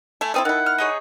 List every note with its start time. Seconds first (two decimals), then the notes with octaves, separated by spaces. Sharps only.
0.21 A3 E4 G#5
0.34 A3 C4 E4 A4 D#6
0.45 D#3 E4 F#5
0.66 F6
0.78 D#4 G#4 C#5